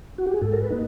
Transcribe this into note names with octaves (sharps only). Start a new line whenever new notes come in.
F#4
G4
G#4
G#2 A4
A#4
B4
A#3 D#4